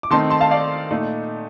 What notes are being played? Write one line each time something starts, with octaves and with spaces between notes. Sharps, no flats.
D6
D#3 A3 C4 D#4 A5 C6
A5 C6
F5 A5
D5 F5
A#2 A3 D#4